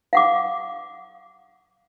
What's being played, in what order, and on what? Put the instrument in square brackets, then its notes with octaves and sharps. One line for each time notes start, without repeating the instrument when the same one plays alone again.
[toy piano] F5 F#5 D6